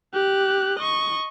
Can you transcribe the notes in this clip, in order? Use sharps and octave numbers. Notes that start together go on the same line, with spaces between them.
G4 F#6
D#5 C#6